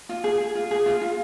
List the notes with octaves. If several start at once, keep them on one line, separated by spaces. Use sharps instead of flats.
F4
G#4
G#4
F4
G#4
F4
F4